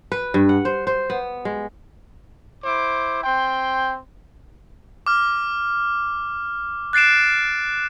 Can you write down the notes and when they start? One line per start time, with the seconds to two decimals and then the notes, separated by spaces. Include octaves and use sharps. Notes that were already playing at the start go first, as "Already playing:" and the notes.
0.12 B4
0.34 G2
0.49 F#5
0.65 C5
0.87 C5
1.10 B3
1.45 G#3
2.64 E4 C5 D6
3.24 C4 G5 C6
5.06 D6 F6
6.93 F#6 A6 C7 D7 E7